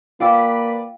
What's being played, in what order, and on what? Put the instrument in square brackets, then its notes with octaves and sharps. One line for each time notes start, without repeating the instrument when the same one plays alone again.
[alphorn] A#3 [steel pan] F4 [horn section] B4 D5 B5 [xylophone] F5 G5 E6